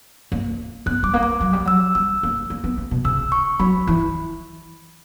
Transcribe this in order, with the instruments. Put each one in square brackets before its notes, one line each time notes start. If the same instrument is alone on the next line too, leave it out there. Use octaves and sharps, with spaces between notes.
[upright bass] A#3
[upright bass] B3 [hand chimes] F#6
[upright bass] G3 [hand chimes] D6
[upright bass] A#3
[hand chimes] D6
[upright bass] F#3
G3
[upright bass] F#3 [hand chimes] E6
[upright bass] G3 [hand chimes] E6
[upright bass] A#3
A#3
B3
A#3
B2
[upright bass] C#3 [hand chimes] E6
[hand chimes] C#6
[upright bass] F#3 [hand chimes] B5
[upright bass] E3